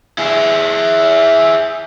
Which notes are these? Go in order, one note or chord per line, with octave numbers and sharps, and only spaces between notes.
E4 G#4